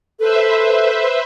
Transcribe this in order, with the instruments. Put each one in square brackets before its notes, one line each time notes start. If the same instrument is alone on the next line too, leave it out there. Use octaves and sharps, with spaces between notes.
[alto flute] A4 [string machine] B4 C5 E5